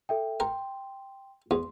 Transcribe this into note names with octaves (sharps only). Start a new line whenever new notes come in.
A4 E5 G5
A#4 G5 C6
E2 C6